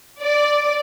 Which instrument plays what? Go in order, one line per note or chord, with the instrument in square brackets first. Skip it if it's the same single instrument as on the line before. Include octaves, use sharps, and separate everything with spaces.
[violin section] D5